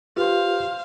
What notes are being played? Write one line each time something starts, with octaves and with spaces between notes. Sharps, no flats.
F4 G4 B4 C5 F5